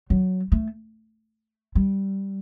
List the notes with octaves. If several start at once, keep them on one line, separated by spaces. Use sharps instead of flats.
F#3
A3
G3